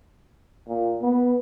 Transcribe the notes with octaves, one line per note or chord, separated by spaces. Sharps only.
A#2
B3